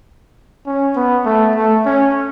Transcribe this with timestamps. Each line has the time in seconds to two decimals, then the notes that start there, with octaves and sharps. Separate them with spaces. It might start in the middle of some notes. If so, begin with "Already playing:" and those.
0.66 C#4
0.96 B3
1.25 A3
1.56 A3
1.85 C#4